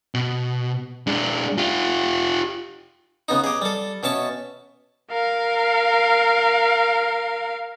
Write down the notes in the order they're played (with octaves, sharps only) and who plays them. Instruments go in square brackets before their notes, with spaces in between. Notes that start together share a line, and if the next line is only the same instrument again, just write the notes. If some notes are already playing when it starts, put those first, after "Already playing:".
[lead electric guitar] B2
G#3 D4
F4 G4
[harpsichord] C#3 B3 D#4
G4 G#4
G3 A4
B2 C#4 E5 A5 C#6
[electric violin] A#4 F5